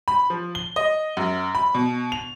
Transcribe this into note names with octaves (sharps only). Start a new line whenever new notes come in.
B5
F3
G7
D#5
F#2
B5
B2
F7